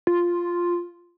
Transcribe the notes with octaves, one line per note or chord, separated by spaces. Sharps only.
F4